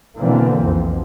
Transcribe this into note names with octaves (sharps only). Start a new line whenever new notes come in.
B2 D3 E3 A#3 C4
B1 F2